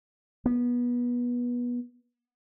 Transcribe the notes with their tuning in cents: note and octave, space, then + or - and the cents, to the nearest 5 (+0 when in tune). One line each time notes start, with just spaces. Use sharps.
B3 -25